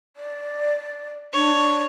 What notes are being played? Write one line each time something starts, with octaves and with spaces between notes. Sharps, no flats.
D5
D4 C#5